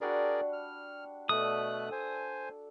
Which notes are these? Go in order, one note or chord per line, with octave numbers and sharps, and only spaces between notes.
G3 D4 F#4 G#4 A#4 D5
F6
B2 A3 A4 D5 D#6 F#6
C5 G#5